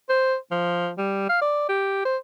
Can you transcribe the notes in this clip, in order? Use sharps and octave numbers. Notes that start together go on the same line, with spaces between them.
C5
F3
G3
F5
D5
G4
C5